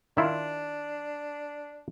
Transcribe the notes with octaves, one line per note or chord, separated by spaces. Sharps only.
D#3 D4 E4 F4